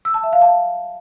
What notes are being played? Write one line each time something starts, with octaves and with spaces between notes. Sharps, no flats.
E6
A5
E5
F5
A5